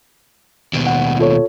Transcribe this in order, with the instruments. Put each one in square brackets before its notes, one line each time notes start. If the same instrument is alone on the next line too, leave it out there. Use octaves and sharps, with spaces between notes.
[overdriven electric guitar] D#2 B2
[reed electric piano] F#5
F4 A4 C#5